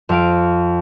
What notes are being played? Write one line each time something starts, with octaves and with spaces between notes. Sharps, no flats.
F2 F5 D7